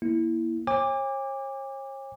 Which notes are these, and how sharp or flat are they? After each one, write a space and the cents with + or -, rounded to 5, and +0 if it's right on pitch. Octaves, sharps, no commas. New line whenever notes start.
A#3 +25 E4 -5
C#5 -40 G#5 -45 D6 +0